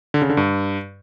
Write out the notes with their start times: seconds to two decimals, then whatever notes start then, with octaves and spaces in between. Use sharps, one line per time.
0.14 D3
0.22 C#3
0.29 D3
0.37 G2